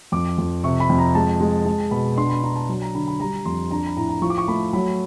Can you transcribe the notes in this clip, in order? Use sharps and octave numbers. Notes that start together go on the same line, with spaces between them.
F2 D6
F2
C3 C#6
B5
F2
A#5
G#3 A5
G#3
G#3 A5
B2 B5
D4 C6
B5
D4 A#5
A5
F#3
A#5
D3 B5
B5
G3 A#5
F2 C6
D4 A#5
B5
A2 A#5
A#5
F3 C#6
D6
C#6
A3 B5
F#3 B5